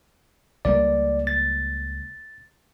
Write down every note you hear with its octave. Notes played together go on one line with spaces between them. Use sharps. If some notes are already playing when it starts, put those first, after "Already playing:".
C#2 G3 A#3 D5
A6